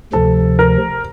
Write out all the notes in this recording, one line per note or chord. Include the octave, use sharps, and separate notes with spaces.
D2 C3 F3 A4
A#4